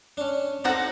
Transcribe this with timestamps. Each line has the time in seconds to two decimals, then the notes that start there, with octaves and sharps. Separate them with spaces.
0.17 C#4 D4
0.64 C4 D#4 F#4 A4 F#5